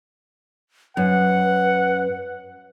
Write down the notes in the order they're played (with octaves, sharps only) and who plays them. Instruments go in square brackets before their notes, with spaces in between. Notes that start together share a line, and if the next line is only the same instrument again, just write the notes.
[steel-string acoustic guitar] F#2 [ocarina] B4 [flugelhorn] F#5